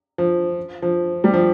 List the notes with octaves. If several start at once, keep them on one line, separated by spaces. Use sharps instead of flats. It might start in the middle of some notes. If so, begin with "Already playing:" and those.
F3
F3
G3
F3